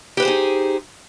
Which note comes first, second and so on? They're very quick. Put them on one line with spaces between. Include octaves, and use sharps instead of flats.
G4 B4 C5 G#4 D#4